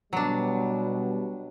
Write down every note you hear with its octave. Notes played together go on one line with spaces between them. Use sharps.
B2 F#3 G3 D4